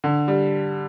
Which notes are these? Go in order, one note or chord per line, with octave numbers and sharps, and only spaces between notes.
D3
G3